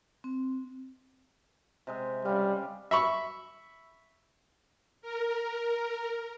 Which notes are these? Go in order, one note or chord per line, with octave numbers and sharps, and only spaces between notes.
C4
C3 G#3 E5
C#3 G3 F5
E5 B5 C#6
A#4